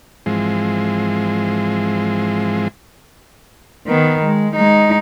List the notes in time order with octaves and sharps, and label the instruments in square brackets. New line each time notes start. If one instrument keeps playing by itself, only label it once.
[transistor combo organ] G#2 E3 F3 G#3 C4
[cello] D#3 B3
G#3
G#3 D#4